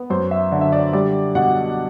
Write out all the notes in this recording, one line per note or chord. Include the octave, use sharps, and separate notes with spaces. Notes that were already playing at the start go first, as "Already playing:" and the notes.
Already playing: B3
F#2 C5
E5
D3
E5
D5
G3 D5
B2 F#5